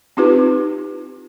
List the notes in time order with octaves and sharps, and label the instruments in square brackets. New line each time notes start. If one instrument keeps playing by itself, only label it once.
[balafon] C4 D#4 F4 G4 B4